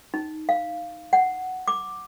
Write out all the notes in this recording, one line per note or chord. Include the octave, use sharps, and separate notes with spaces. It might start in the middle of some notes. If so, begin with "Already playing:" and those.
D#4
F5
F#5
D6